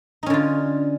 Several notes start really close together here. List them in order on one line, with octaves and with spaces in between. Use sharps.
D#4 C#4 D3 F4